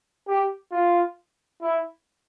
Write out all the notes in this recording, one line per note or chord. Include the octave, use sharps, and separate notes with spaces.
G4
F4
E4